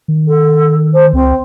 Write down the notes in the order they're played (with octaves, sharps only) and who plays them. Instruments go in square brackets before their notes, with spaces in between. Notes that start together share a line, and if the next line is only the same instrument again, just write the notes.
[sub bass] D#3
[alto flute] A4
C5
[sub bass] C#2 [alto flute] C4